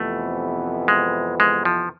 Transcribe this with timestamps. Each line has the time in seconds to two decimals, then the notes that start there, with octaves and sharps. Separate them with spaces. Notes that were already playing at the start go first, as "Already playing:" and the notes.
Already playing: F2 C3 E3 A3 B3
0.88 G#3
1.40 G#3
1.65 F3